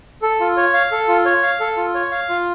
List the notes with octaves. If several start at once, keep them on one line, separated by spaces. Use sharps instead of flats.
A4
F4
C#5
F5
A4
F4
C#5
F5
A4
F4
C#5
F5
F4